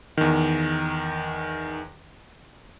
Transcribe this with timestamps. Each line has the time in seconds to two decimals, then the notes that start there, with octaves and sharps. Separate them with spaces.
0.17 E2 D#3